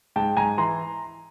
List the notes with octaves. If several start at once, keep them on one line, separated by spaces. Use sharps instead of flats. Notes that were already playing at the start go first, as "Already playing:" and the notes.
G#2 G5 A5
G#2 G#5 A#5
E3 A#5 C6